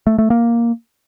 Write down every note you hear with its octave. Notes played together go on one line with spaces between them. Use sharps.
A3
A3
A#3